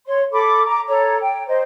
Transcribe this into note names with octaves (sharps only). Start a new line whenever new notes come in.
C#5 C6
A4 B5 D6
A#5 D6
A4 C#5 A#5
G5
C5 D#5